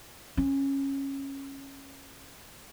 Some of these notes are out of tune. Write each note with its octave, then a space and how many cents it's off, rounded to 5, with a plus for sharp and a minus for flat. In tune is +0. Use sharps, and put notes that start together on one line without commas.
C#4 -15